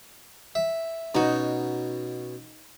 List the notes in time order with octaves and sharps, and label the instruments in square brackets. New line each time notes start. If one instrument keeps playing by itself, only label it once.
[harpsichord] E5
[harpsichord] B2 C#4 [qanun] D#4 F#4